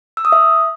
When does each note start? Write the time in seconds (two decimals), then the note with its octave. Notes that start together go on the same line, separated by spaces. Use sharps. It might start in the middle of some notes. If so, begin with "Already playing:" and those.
0.17 E6
0.25 D#6
0.32 E5